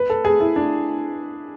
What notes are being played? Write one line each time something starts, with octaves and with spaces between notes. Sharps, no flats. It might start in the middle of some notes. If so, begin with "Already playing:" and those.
Already playing: B4
A4
G#4
E4
D4